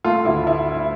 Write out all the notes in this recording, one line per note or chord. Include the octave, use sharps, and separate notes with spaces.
A3 F4
D2 E4
E4